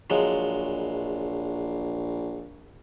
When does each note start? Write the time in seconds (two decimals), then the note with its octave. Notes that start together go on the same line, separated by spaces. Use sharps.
0.10 A#1 F3 F#3 G#3